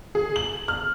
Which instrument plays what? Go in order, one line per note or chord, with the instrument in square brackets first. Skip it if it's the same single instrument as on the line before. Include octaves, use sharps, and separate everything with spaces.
[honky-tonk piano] G#4
F#7
F6